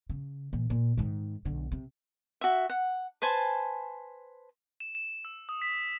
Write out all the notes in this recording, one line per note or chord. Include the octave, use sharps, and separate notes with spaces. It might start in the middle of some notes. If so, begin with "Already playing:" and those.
C#3
A#2 E3
A#2
G#2 D#3
B1 D3
C3
F#4 E5
F#5
B4 C5 G#5 A5
E7
E7
E6
D#6
B6